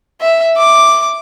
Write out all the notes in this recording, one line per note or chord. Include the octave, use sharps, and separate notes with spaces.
E5
D6